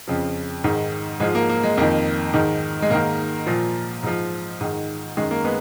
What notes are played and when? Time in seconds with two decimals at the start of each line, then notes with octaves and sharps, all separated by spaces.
0.08 F2 C#3 F3
0.64 G#2 D#3
1.20 G#2 F3 G#3
1.35 A#3
1.49 A#3
1.63 G#3
1.77 F2 D#3 A#3
2.34 G#2 D#3
2.82 G#3
2.90 G#2 D#3 A#3
3.47 A#2 F3
4.03 G#2 F3
4.61 G#2 D#3
5.17 F#2 D#3 G#3
5.31 A#3
5.45 G#3 B3